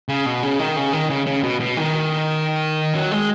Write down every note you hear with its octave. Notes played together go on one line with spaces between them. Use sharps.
C#3
B2
C#3
D#3
C#3
D#3
C#3
C#3
B2
B2
D#3
F#3
G#3